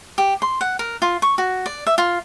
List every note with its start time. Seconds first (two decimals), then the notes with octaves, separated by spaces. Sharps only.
0.18 G4
0.42 C6
0.61 F#5
0.79 A#4
1.02 F4
1.22 C#6
1.38 F#4
1.66 D5
1.87 E5
1.98 F4